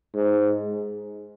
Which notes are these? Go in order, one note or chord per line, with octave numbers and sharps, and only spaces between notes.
G#2